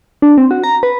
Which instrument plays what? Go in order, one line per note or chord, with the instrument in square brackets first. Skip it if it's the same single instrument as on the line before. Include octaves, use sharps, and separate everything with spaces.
[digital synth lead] D4
C4
F#4
A#5
B4